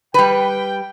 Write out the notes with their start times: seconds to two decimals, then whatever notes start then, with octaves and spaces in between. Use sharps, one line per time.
0.14 G3 B4 G5